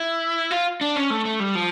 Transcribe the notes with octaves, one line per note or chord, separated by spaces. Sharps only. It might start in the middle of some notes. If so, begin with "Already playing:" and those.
Already playing: E4
F4
D4
C#4
A3
A3
G3
F3